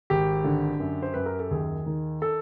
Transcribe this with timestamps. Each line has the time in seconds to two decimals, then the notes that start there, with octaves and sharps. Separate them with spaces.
0.10 G#1 G4
0.44 D3
0.80 F#2
1.02 C5
1.14 F#2 B4
1.26 A#4
1.39 A4
1.51 D#2 G#4
1.86 D#3
2.22 A4